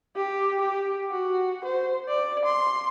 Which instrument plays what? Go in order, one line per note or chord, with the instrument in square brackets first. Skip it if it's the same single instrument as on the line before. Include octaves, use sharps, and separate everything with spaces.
[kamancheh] G4
G4
F#4
C5
D5
C6